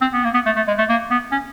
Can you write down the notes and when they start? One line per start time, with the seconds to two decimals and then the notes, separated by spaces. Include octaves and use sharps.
0.01 C4
0.13 B3
0.24 A#3
0.34 B3
0.46 A3
0.56 A3
0.68 G#3
0.78 A3
0.89 A#3
1.11 B3
1.32 C#4